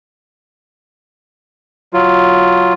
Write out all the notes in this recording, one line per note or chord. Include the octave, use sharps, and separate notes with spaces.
F#3 F4